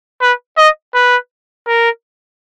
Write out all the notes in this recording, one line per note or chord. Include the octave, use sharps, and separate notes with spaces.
B4
D#5
B4
A#4